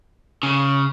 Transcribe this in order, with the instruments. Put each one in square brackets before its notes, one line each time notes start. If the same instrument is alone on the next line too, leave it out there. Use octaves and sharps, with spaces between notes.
[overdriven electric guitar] C#3